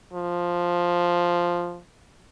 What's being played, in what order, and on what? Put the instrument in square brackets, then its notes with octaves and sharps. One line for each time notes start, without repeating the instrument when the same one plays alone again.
[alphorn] F3